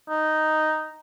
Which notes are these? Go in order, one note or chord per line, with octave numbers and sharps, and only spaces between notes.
D#4